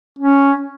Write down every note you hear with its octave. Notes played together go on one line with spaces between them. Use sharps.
C#4